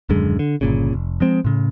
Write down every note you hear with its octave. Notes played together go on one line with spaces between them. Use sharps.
D#1 F#2 D3 G#3
D3
G1 A#2 C#3
F1
F3 G#3 C4
A2 C#3